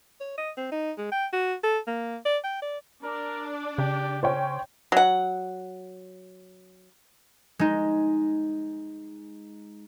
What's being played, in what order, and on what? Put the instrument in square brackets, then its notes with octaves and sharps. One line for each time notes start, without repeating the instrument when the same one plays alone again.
[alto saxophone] C#5
D#5
C4
D#4
G#3
G5
F#4
A4
A#3
D5
G5
D5
[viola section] D4 D5 [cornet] A#4
[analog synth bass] C#3 [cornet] G4
[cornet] C#4 [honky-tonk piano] C5 C#5 G5
[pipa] F#3 F#5
[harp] G#3 D#4